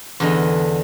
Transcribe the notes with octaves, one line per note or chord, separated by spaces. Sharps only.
E2 D3 D#5